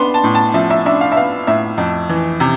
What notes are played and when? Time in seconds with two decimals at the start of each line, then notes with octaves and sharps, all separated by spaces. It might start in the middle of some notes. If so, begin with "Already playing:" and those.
Already playing: B3 D4 C6
0.14 A5
0.24 A2
0.35 A5
0.54 F3 E5
0.70 E5
0.86 D4 E5
1.01 F5
1.12 E5
1.16 B3 F5
1.47 A2 E5
1.78 F2
2.09 E3
2.40 C3